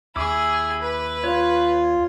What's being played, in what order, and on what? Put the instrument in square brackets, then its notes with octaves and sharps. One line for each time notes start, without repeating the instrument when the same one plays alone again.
[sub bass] D#2 [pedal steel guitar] E4 D6 [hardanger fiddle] G#4 B5
[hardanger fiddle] B4
[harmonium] F4 [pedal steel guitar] C#5